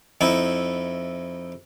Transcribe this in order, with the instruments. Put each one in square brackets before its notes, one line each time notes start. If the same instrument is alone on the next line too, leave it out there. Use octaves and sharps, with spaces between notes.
[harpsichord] F2 D#4 E4